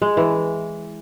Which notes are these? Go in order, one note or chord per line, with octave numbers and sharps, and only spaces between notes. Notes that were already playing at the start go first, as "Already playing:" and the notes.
G#3
E3